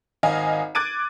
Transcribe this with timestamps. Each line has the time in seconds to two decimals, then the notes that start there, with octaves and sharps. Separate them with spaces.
0.23 G#1 D#5 F5 G#5
0.75 D6 F#6 G#6 A6 D7 D#7